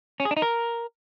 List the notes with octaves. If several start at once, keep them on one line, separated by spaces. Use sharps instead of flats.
C#4
G#4
D4
D#4
A#4